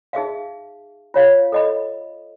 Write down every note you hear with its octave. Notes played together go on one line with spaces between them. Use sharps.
D#4 G#4 E5 F5
F4 C#5 F5
A4 D#5 B5